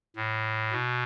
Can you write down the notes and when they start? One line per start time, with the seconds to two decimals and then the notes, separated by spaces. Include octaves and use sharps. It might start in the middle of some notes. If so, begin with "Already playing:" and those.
0.16 A2
0.72 B2